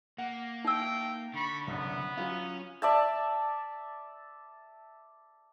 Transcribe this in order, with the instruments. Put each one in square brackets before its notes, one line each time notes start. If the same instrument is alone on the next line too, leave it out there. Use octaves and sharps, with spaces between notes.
[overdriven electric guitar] A#3 [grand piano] F#5
[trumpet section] A3 G5 [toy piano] D#4 E6
[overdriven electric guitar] D3 [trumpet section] B5 C#6
[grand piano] F#1 C2 [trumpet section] B3
[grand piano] F#3 F4 [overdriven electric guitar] C#4
[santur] D5 E5 A5